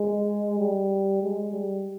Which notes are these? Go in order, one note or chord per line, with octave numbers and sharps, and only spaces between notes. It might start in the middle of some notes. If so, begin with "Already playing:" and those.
Already playing: G#3
G3
G#3
G3